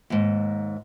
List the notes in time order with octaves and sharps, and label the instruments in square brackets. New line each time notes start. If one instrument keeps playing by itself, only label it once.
[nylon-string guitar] D#2 G#2